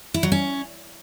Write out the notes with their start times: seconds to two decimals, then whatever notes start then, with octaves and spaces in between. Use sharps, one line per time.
0.14 E4
0.23 F#3
0.32 C#4